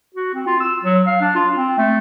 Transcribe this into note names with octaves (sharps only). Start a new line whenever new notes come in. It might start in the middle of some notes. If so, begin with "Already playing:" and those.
F#4
C4
F4
E6
F#3
F5
D4
F4
C4
A3